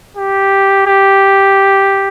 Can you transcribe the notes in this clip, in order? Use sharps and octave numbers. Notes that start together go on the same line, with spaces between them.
G4
G4